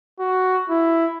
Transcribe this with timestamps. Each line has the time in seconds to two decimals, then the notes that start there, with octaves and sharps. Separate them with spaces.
0.19 F#4
0.70 E4